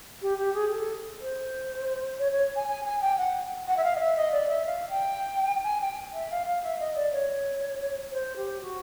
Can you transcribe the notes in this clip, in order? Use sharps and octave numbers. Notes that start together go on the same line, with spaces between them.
G4
G4
G#4
A4
C5
C#5
C#5
G#5
G#5
G#5
G5
F#5
F#5
E5
F5
D#5
E5
D#5
D5
E5
F5
G5
G#5
G5
E5
F5
F5
E5
D#5
D5
C#5
C5
G4
F#4